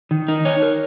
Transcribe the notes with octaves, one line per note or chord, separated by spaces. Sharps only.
D#3
D#4
C#5
A#4